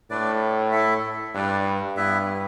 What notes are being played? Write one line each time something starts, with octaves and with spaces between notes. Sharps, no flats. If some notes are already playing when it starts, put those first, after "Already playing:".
A2 A3 D4 B4 D5
A3 E4 A4 E5
G2 D4 B4 D5
G2 B3 E4 B4 E5